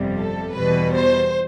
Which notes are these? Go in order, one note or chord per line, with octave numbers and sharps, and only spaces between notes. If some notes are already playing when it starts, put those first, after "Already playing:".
Already playing: G1 F2 C3 G3
A4
E2 B2 G3 B4
C5